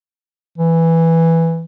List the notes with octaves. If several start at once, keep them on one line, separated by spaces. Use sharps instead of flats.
E3